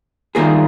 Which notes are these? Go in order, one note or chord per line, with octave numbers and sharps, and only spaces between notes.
G2 D#3 A#3 F4 G#4